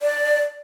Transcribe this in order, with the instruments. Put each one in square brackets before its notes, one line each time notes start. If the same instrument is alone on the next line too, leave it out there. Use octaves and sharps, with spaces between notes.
[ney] D5